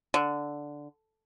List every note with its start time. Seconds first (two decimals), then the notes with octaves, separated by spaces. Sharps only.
0.14 D3